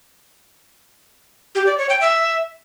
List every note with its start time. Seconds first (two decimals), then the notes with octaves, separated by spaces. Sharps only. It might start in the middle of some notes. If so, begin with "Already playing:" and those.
1.55 G4
1.67 D5
1.78 C#5
1.89 G5
2.01 E5